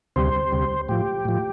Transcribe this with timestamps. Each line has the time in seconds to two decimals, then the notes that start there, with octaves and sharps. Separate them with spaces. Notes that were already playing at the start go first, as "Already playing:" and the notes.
0.16 D2 C3 G3 C5
0.52 D2 C3 G3
0.89 A2 F3 G4
1.25 A2 F3